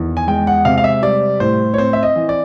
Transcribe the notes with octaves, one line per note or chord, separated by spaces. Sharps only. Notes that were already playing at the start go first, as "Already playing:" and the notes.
Already playing: E2 D#3
G#5
G#3 G5
F#5
C3 F5
F5
E5
G3 D5
A2 C5
C#5
C4 C5
E5
D#5
E3
D5